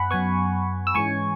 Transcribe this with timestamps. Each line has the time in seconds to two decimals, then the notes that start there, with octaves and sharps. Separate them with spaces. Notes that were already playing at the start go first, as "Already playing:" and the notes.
Already playing: F#2 B3 F#5 G#5 B5
0.11 F#2 F#3 B3 G#5 C#6
0.87 E6
0.95 G#2 E3 G#3 C#4 G#5 C#6